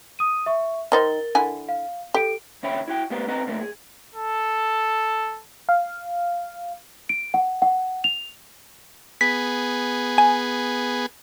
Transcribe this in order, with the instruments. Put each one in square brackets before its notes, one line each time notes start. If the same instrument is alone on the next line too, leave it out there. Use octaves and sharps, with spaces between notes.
[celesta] D#6 D#7
E5 C#6
[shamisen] D#3 D#4 C5 [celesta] A#4 A6 G7
[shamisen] D3 E4 G#5
[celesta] F5
[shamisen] G4 [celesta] A4 D7
[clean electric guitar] D#2 C#3 C#5 E5 G5 B5
E4 F#4 G5
G3 A3 B3 B4 F5
C4 A4 B4 D#5 F#5 A#5
C#3 F3 A3 A#3 A#4
G#4
[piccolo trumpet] A4
[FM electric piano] F5
[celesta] D7
F#5
F#5
F7
[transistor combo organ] B3 G#4 [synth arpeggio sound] B6
[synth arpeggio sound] G#5